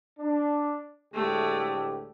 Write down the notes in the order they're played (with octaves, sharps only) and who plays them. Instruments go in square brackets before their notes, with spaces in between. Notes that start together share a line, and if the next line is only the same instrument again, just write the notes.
[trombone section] D4
[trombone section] D2 A2 G4 [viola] G#3 A3